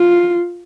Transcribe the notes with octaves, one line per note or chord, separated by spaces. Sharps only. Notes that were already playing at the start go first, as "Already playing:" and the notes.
Already playing: F4